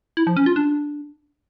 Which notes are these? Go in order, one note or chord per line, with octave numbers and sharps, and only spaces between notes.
E4
F3
C#4
F4
D4